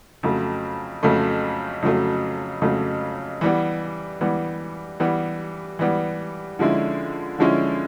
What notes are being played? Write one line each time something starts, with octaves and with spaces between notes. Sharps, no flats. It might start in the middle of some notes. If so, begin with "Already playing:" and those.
F2 C#3 F#3 A3
F2 C#3 F#3 A3
F2 C#3 F#3 A3
F2 C#3 F#3 A3
E3 G3 B3
E3 G3 B3
E3 G3 B3
E3 G3 B3
D3 F3 G#3 C#4 E4
D3 F3 G#3 C#4 E4